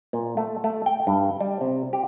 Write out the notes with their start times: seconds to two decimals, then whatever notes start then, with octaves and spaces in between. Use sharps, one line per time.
0.13 A#2
0.37 A3
0.64 A3
0.86 G5
1.07 G2
1.40 G3
1.61 C3
1.93 G4